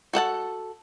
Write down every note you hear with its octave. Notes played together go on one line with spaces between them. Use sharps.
F#4 A4 F#5 A5